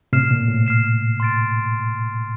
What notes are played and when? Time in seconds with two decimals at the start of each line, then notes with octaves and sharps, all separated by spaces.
0.13 A2 C3 F6 C7 E7
0.31 A#2
0.48 A2
0.66 F6 C7 E7
1.20 C6 F6 A6 D7